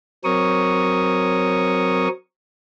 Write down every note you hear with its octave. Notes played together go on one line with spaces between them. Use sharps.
F#3 C4 A#4 C#5 C#6 D#6